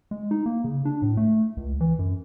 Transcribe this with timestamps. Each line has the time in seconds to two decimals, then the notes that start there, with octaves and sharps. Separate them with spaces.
0.11 G#3
0.31 D#4
0.46 A#3
0.64 C#3
0.85 D4
1.02 A2
1.17 A3
1.57 C#2
1.80 E3
1.99 F#2